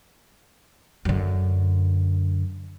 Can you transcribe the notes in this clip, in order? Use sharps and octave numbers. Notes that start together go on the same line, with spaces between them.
F#2 D3